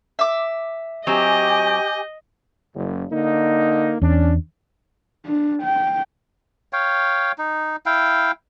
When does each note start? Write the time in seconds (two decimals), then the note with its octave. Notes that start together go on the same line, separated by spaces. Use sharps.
0.19 E5 D6
1.07 F#3 C4 G4 D#5 G#5 G6
2.74 F#1
3.12 D3 A#3 D#4
4.02 E2 C#4 D4
5.26 D4
5.63 G5
6.73 C#5 F5 G5
7.38 D#4
7.86 E4 F5 G5